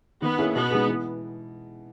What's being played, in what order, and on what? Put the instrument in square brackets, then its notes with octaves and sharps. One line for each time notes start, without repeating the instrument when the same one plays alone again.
[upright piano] D#3 [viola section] B3
[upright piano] A#3 C#4 E4 G#4
[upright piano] B2 [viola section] B3
[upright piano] G#3 D#4 G#4
E3